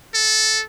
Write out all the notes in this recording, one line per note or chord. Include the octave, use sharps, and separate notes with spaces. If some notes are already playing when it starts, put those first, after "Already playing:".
A4